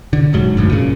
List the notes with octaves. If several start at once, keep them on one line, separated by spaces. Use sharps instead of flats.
D3
E1 G#2 F#3
F#1 D2 G#2
A#2 C#3